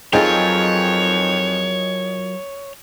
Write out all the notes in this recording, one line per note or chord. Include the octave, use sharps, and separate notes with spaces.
F2 F#3 D#4 F4 G#4 A#4 C#5 G5